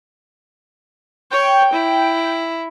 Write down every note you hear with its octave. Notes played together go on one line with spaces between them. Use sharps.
C#5 G5
E4